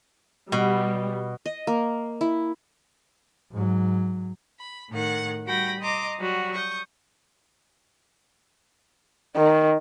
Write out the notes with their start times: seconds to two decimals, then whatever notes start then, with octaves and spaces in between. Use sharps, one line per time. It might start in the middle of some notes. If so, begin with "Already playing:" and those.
0.52 B2 G3
1.46 D#5
1.67 A#3
2.21 E4
3.52 G#2 F#3
4.59 B5
4.89 A2 D#3 F#5
5.45 G3 F#4 G5 B5 A#6
5.80 D#5 A#5 C6 D6
6.18 F#3 G3 F#4
6.53 C#6 D#6 G6
9.36 D#3